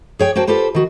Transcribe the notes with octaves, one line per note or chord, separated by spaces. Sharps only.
G#4 C#5 G5
A#3 F#4 C5 G5 A5
F4 G4 A4 B4 C5
D#3 F#4